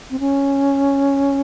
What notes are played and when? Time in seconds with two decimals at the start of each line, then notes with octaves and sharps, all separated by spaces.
0.11 C4
0.20 C#4